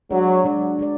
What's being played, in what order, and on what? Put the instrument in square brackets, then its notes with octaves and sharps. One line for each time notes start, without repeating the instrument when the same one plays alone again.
[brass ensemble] F#3 [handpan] G#3 D4 G#4 D5
[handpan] G#3 D4 G#4 D5
G#3 D4 G#4 D5